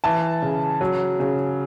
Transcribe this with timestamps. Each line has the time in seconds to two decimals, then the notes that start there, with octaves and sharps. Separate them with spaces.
0.04 E3 A5
0.42 C#3
0.81 F#3
1.20 C#3